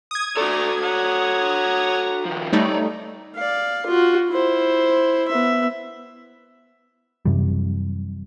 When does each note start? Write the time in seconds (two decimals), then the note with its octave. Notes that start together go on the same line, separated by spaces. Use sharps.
0.11 D#6 G#6
0.37 A3 F#4 A4 D5 A#5
0.83 C#5 F#5 A#5
2.25 D#3 F3
2.53 G3 A3 D#4 C#5 D5
3.36 D5 F5
3.87 F4 F#4
4.30 E4 C5
5.28 B3 E5
7.25 F#2 C3 E3 G3